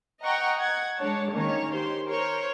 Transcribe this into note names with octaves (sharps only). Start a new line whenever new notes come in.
D#5 F#5 G5 A#5 C#6
F#5 G#6
G#3 D4 C#5 A5
D#3 A#3 C#4 C#5
G4 C5 C6
A#4 C5 C#5